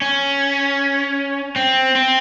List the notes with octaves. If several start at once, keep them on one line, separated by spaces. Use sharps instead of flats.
C#4
C4
C4